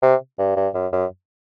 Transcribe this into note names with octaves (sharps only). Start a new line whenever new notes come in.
C3
G2
G2
F#2
F#2